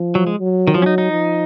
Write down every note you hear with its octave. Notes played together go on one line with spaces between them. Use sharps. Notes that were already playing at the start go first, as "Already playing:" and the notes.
Already playing: F3
F#3
G#3
F#3
D#3
F3 F#3
C#4
D#4
D#4
F3